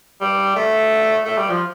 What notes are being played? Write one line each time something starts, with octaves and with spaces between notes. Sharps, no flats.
G3
A3
A3
G3
F3